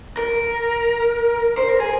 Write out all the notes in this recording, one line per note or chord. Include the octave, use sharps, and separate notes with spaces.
A#4
C5
A#4
G#4